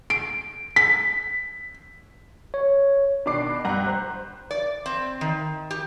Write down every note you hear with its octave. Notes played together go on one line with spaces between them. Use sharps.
D7
B6
C#5
B2 D#3 D4 D6 C7
G2 F#5 A#5 F#6
C5
D5
C4
D#3
G4